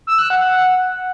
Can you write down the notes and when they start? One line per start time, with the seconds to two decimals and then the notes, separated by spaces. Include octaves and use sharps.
0.07 E6
0.19 F#6
0.30 F#5